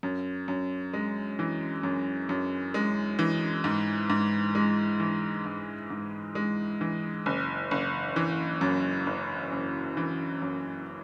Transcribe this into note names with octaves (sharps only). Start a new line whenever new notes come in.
F#2
F#2
G#3
E3
F#2
F#2
G#3
E3
G#2
G#2
G#3
E3
G#2
G#2
G#3
E3
F#1
F#1
E3
F#2
F#1
F#1
E3
F#2